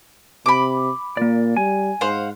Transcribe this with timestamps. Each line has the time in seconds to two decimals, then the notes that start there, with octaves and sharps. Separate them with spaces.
0.46 C3 B5 D6
1.17 A#2 A#3 D5
1.57 G3 G#5
2.01 G#2 C5 F5 F#5